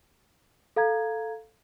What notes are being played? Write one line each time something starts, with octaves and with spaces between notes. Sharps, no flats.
A4 F5 A#5 G#6